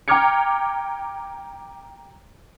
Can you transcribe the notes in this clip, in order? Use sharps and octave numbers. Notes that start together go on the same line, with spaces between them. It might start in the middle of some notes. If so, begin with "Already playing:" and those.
G5 A#5 D6 F6 G#6 C#7